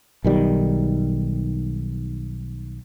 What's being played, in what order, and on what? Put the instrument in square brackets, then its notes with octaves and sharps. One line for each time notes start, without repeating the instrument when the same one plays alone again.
[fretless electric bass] B1 D#3 G3